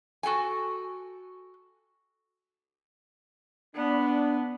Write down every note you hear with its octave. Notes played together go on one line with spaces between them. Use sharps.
F#4 A4 G5 G#5
B3 D4